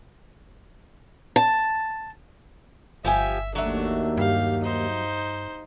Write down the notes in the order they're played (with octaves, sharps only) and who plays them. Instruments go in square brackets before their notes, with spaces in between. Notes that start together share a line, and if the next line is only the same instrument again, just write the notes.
[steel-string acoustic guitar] A5
[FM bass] G1 [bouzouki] F3 G4 G#5 [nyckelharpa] E5
[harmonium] D#2 [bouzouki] F#3 E5 [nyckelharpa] A3 D4
[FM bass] G2 [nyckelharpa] G4 F5
[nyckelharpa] D#4 C5